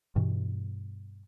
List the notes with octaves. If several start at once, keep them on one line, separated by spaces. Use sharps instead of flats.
G2 B2 E3